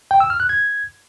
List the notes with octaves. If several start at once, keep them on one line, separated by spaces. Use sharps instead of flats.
G5
E6
F6
F#6
G#6